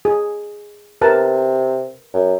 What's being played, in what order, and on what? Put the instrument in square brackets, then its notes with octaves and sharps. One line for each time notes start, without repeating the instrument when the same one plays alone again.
[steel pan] G#4
[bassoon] C3 [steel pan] A#4 B4 A5
[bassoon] F#2